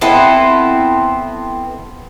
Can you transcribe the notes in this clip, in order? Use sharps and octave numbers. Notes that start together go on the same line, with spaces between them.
B3 C4 E4 A4